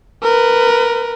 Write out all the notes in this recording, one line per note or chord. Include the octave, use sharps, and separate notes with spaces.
A#4 B4